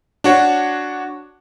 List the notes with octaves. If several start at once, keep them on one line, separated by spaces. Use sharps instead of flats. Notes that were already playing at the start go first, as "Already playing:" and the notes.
D4 F#4 C#5